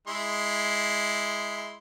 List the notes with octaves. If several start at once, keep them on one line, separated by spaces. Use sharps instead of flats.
G#3 E4 C6